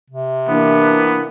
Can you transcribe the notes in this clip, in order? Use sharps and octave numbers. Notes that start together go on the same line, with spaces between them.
C3
E3 A#3 B3 D4